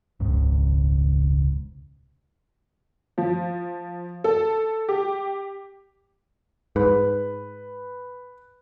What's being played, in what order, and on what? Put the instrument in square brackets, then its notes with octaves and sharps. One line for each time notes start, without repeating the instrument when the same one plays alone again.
[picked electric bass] E1 C#2 G#2 C#3
[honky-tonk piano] F3
A4
G4
[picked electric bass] G#2 [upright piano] B4